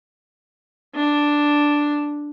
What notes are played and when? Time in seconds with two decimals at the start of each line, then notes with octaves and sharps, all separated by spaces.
0.95 D4